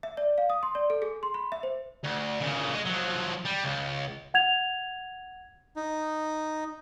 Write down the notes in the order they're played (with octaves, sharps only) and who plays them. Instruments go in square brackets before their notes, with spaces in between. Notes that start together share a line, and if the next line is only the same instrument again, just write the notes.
[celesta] E5
D5
F5
D#6
C6
D5
A4
G#4
C6
B5
E5
C5
[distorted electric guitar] D2
A#2 C#3
G#3
F3 F#3
G3
C#2
[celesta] F#5 G#6 F7
[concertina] D#4